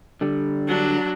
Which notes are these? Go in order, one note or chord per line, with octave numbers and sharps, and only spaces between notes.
D3 G3
F#3 D4